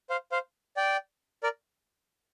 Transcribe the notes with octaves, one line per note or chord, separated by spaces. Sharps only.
C5 F5
C5 F5
D5 G5
A#4 D5